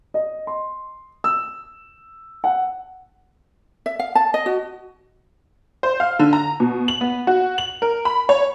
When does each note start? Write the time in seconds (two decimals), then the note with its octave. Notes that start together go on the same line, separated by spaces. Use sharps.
0.14 D#5
0.47 C6
1.24 E6
2.44 F#5
3.86 E5
3.99 F5
4.15 A5
4.34 D#5
4.46 F#4
5.83 C5
6.00 F5
6.19 D3
6.33 A#5
6.60 B2
6.88 F#7
7.01 B3
7.27 F#4
7.58 F#7
7.82 A#4
8.05 B5
8.29 C#5